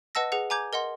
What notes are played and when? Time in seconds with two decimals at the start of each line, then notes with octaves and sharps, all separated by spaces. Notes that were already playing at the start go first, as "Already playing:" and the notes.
0.15 B4 D#5 F#5 A5 E6 A#6
0.32 G#4 B4 F#5
0.50 G#5 A#5 D6 G6 G#6
0.73 A#4 D#5 F#5 C6